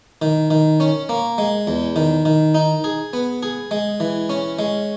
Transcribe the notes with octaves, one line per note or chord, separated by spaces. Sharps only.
D#3
D#3
C#4
A#3
G#3
E2
D#3
D#3
D#4
G#4
B3
G#4
G#3
E3
C#4
G#3